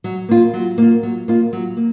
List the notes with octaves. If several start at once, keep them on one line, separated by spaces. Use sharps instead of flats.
F#3
A#3 F4
F#3
A#3 F4
F#3
A#3 F4
F#3
A#3